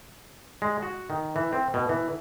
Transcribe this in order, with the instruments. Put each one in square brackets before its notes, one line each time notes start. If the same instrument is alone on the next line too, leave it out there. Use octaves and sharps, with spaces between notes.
[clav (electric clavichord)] G#3
F#4
D#3
E3
C4
B2
E3